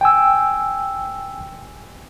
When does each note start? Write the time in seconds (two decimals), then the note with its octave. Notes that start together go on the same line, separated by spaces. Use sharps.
0.01 G5 G#5 E6